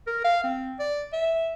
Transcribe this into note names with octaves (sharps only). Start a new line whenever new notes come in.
A#4
F5
C4
D5
E5